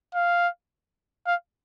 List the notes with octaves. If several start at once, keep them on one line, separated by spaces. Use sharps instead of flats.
F5
F5